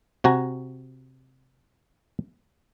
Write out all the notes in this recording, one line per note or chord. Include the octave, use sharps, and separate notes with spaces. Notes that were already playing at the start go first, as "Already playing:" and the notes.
C3 F#4 G#5 A#5